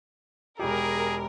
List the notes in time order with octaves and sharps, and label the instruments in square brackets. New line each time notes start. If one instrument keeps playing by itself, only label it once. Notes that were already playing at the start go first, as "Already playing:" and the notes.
[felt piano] E1 G4 [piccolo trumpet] G#4 [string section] A#4